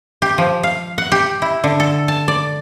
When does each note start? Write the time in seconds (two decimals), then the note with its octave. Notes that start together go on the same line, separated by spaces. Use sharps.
0.22 G4
0.38 F3
0.63 F5
0.98 F#5
1.12 G4
1.42 E4
1.64 D3
1.80 A4
2.08 A5
2.28 D5